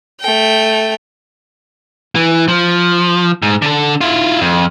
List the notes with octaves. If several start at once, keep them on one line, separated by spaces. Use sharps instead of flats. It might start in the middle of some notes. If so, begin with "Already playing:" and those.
A3 G5
E3
F3
G#2
D3 A4
E4 F4
F2